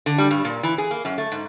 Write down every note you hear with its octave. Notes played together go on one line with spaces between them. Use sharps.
D3
G3
G2
A#2
E3
G#4
A#3
F#2
A3
G#2